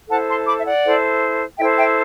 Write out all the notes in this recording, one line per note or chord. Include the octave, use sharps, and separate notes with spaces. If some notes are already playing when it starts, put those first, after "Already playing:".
E4 A4 C5 F#5 A5
A5 C6
B5 D6
E5
D5 F#5
E4 A4 C5
E4 A4 C5 E5 G5
E5 G5